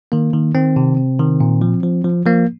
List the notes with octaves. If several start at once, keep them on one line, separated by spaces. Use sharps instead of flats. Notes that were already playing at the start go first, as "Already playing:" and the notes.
D#3 A#3
D#3
D#3 C4
C3
C3
D#3
A#2
F3
F3
F3
F3 A#3